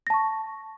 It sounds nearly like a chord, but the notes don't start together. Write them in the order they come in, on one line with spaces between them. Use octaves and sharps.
A#6 A5 C#6